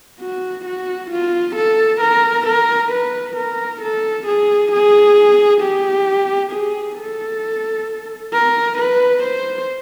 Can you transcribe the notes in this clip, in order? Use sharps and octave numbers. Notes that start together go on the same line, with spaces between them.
F#4
F#4
F4
A4
A#4
A#4
B4
A#4
A4
G#4
G#4
G4
G#4
A4
A#4
B4
C5